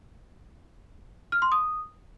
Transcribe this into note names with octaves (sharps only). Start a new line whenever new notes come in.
F6
C6
D#6